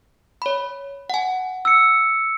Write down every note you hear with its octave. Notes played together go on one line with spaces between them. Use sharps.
C#5 B5
F#5 G#5
E6 C#7